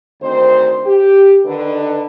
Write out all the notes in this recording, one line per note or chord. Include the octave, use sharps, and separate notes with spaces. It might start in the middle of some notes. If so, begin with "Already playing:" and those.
D2 D#3 C4 C5
G4
D3 D#3 B4